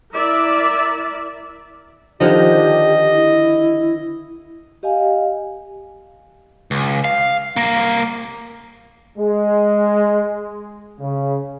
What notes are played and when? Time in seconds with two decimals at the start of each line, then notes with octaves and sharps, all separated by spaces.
0.14 E4 A#4 D5 E5
2.20 D3 D#3 F3 G4 D#5
3.12 E4
4.83 G4 D#5 F5 G#5
6.71 C#2
7.05 F5
7.56 C2 A#3
9.18 G#3
11.00 C#3